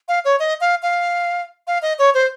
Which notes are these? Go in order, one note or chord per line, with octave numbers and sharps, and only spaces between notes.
F5
C#5
D#5
F5
F5
F5
D#5
C#5
C5